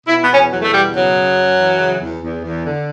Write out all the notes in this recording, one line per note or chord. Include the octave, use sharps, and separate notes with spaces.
B2 E4
B3
E2 C#4
E2 F#3
A3
B2 G3
C#3 F#3
F#2
F#2
E3
C#3
E2
E2
E2
D3